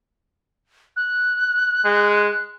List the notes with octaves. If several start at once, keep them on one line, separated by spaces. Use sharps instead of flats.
F#6
G#3